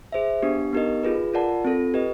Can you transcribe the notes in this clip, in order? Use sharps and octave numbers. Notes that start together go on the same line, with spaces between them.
G#4 C5 E5
B3 D4 G4
B3 D#4 G4 A#4 D#5
F4 G#4 B4
F4 A#4 D5 F#5 A5
C4 F4 A4
G4 B4 D#5